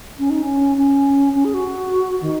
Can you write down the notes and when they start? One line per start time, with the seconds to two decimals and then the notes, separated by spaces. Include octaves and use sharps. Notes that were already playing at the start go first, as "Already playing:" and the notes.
0.19 C#4
0.30 D#4
0.43 C#4
0.77 C#4
1.35 C#4
1.45 G#4
1.54 F#4
2.21 D#3